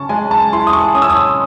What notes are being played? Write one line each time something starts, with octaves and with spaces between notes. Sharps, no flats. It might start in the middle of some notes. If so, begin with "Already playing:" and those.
Already playing: C#3 A5 C#6
G#3 G#5
A5
E4 C6
D#6
C#6
C#4 D#6
E6
D#6